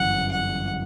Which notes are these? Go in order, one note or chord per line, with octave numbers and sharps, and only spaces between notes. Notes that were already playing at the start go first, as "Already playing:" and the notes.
Already playing: G1 F#2 E3 F#5
F#5